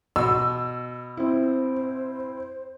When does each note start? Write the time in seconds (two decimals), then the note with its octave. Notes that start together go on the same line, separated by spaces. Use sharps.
0.16 B2 E6
1.17 C4 E4 C5